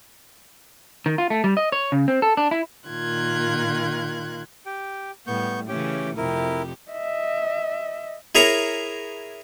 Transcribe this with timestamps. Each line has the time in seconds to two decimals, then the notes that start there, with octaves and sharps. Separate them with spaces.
1.06 D#3
1.18 F4
1.30 A3
1.44 G3
1.57 D#5
1.72 C#5
1.92 C#3
2.08 C4
2.22 A4
2.37 D4
2.51 E4
2.87 A#2 D#3 F4 F#6 G#6
4.66 G4 G5
5.27 A2 G3 B3 C#6 G6
5.68 C#3 E3 A3 C#4 G4 G5
6.17 F2 C3 E4 G4 A#4
6.92 D#5 E5
8.35 E4 G#4 A#4 C#5 A#5